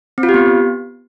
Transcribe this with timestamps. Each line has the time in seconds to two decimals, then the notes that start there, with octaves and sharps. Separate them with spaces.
0.18 C4
0.23 F4
0.29 G4
0.34 B3